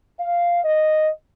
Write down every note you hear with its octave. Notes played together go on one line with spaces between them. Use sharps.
F5
D#5